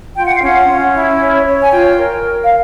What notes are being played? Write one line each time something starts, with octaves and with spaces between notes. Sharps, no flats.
F4 G5
F#5
F5
C#4 F#5
C#4
E4
C#5
C#5
G#5
F4 G5
A#4
A#4
F5